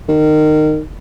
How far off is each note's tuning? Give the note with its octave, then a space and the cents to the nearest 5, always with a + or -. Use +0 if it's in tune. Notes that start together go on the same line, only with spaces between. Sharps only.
D#3 -20